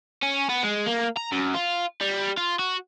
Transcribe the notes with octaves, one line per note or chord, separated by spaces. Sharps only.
C#4
B3
G#3
A#3
A#5
F#2
F4
G3
F4
F#4